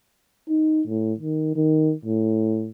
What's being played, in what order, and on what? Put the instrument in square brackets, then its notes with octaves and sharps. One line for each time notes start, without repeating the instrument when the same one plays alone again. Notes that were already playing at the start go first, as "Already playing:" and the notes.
[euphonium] D#4
A2
D#3
D#3
A2